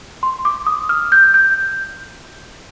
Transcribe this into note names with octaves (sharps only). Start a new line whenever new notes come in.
C6
D6
D#6
F6
G6
G6